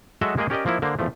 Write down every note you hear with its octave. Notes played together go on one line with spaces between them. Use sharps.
F#3 G#3 F#4 A4 D#5 E5
G#3 A#3 G4 G#4 D#5
C#4 G4 A#4 D5 D#5
F3 A#3 E4
D3 A#3 C5
E2 F3 A3